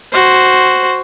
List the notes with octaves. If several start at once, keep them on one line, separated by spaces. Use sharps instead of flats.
F#4 C5